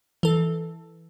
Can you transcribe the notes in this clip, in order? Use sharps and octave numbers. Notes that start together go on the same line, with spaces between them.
E3 A4